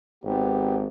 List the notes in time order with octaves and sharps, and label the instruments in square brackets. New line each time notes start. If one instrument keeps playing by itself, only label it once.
[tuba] G#1 [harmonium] B3 G4